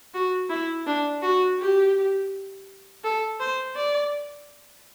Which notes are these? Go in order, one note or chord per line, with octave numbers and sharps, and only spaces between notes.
F#4
E4
D4
F#4
G4
A4
C5
D5